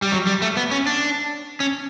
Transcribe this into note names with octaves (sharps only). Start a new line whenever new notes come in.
G3
F#3
G3
A3
B3
C#4
D4
C#4